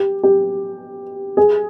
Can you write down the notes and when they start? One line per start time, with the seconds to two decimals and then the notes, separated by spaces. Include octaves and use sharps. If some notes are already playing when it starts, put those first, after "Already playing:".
Already playing: G4
0.23 G4
1.37 G#4